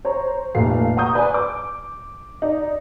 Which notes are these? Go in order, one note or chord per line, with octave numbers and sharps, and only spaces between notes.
C5 C#5 A#5
F1 A#2 A3 F5 C7
F#5 A#5 C#6 D#6 G6
B4 D5 G#5
D6
D#4 D5